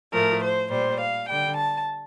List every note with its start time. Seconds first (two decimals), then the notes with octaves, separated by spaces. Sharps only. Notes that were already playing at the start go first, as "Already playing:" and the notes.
0.13 A2 F3 A3 A#4
0.43 C5
0.70 A#2 G3 C5
1.00 F5
1.28 D3 G3 G5
1.57 A5